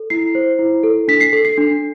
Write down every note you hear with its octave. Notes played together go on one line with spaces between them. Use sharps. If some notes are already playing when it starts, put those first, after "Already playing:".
Already playing: A4
E4 C7
C5
E4
A4
D4 B6
C7
A4
C7
D4